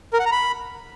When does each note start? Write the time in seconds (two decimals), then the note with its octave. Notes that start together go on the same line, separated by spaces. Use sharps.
0.13 A#4
0.19 F#5
0.25 A#5
0.32 B5